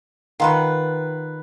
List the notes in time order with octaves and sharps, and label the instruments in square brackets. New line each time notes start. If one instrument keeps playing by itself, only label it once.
[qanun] D#3 [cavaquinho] F4 B4 F#5